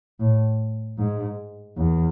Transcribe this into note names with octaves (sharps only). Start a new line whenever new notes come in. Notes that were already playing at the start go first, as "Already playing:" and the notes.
A2
G#2
E2